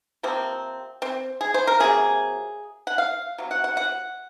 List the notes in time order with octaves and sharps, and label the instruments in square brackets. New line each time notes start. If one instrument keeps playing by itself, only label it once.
[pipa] C3 F3 A#3 C4
C4
G#4
C5
A#4
C3 F#3 A#3 G#4
F#5
F5
C3 F#3
F#5
F#5
F#5